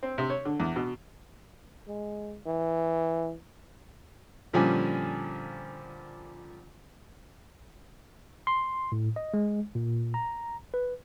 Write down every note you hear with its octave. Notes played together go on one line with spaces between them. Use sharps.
C4
C3
C#5
D3
E2
B2
G#3
E3
A#2 D3 F3 G3 C#4 G#5
C6
A2
D#5
G#3
A#2
A#5
B4